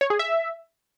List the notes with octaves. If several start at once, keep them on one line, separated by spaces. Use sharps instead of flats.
C#5
G#4
E5